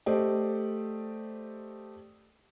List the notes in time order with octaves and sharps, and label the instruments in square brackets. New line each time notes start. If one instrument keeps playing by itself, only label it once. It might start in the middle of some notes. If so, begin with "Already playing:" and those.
[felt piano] A3 G4 C5 D5 D#5